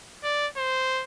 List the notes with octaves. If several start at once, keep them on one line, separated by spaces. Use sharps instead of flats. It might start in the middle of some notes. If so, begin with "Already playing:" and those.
D5
C5